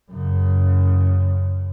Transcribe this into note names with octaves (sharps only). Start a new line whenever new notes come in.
F#2 C#3